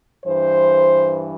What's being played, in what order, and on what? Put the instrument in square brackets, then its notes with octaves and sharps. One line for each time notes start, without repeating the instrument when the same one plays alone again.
[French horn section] G2 E3 C5